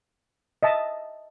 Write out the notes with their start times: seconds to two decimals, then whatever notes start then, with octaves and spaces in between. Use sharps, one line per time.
0.63 D#5 E5 A5